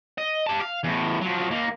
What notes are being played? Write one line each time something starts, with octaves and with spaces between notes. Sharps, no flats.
D#5
G4 A5
F5
E2 A2
F3 F#3
D#2 A#3